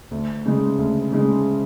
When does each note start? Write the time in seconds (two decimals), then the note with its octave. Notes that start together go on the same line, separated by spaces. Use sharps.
0.11 D2
0.46 C#3 G#3
0.79 D2
1.13 C#3 G#3